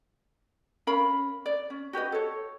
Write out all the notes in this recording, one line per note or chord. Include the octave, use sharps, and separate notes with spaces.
C#4 A#4 F5 B5
D5
C#4
F#4 G4 B4 D#5
A4 C#5